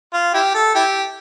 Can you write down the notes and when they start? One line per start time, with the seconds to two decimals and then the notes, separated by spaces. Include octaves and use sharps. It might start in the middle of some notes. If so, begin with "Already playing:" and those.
0.13 F4
0.34 E4 G4
0.55 A4
0.75 E4 G4